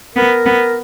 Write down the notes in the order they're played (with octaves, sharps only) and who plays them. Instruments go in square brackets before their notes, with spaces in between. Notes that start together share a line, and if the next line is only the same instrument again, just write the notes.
[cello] B3 [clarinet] A#4
[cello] B3